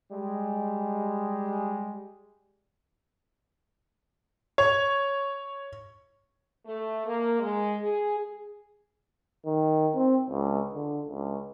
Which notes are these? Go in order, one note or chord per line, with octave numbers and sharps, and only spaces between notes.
G3 G#3
C#5
A3
A#3
G#3
G#4
D#3
C4
C#2
D3
C#2